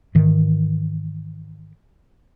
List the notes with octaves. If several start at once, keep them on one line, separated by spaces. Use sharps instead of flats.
G#2 D#3 E3